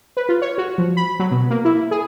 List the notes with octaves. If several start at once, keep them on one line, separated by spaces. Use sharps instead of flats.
B4
F4
C#5
F#4
F3
B5
F#3
B2
A#3
E4
G#4